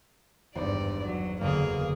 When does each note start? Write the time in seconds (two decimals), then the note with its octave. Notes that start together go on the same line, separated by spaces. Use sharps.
0.55 G#1 E2 G2 C5 D5
1.05 F#3
1.41 F#1 E2 D3 A#3 G#4